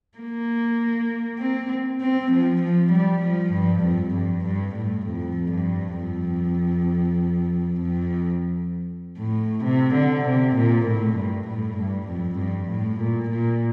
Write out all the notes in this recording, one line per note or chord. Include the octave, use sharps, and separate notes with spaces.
A#3
C4
C4
F3
F3
G3
F3
G2
F2
G2
G2
A2
F2
G2
F2
F2
A2
C3
D3
C3
A#2
A2
G2
A2
G2
F2
G2
A2
A#2
A#2